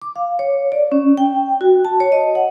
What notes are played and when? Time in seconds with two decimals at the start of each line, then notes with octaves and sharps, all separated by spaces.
0.02 D6
0.16 F5
0.39 C#5
0.72 D5
0.92 C#4
1.17 G5
1.61 F#4
1.85 A5
2.00 C#5
2.12 D#5
2.35 F#5